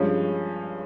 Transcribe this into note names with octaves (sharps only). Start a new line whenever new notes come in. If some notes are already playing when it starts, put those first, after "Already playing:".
Already playing: G2 F3 G#3 C#4